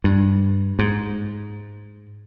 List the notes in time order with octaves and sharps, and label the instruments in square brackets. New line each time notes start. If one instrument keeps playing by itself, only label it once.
[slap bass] G2
G#2